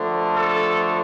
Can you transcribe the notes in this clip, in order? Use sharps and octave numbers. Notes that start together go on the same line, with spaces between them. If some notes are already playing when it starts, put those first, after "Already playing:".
Already playing: D3 F3 A3
A4